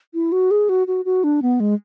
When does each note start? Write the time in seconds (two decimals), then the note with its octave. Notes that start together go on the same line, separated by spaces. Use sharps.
0.14 E4
0.32 F#4
0.51 G#4
0.69 F#4
0.87 F#4
1.05 F#4
1.24 D4
1.42 B3
1.60 G#3